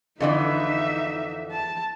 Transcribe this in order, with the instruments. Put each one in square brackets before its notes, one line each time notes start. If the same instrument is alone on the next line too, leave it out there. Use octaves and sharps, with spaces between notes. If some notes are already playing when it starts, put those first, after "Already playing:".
[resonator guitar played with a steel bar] F2 D3 E3 [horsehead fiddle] D#4 E5
[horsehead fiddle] A5